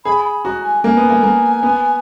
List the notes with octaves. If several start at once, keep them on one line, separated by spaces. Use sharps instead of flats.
G#4 B5
B5
F#4 A#5
G#5
A#3 G#5
B3
A#3
A#3
B3